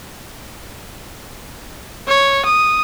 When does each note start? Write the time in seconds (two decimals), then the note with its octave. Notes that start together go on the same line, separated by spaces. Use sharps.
2.08 C#5
2.45 D#6